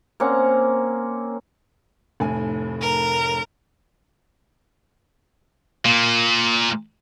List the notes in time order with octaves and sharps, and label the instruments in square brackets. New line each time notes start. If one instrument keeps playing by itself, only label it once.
[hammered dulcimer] A#3 C4 C#4 F#5
[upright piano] F1 A2 G#5
[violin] A#4
[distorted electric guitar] A#2 A#3